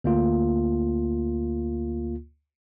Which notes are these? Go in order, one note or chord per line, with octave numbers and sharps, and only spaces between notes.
D2 A#3 F4